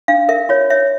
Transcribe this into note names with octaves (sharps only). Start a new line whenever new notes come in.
D4 F5
A#4 E5
F4 C#5
C#5 E5